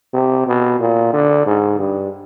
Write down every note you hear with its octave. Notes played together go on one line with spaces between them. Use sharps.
C3
B2
A#2
D3
G#2
G2